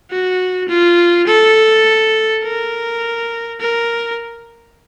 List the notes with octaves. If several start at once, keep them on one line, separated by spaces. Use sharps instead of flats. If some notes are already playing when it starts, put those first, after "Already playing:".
F#4
F4
A4
A#4
A#4